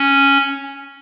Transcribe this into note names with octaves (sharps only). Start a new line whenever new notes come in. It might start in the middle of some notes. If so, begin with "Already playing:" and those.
Already playing: C#4